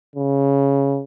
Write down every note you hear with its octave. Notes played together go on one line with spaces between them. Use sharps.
C#3